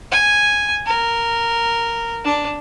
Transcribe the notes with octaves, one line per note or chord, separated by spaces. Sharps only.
G#5
A#4
D4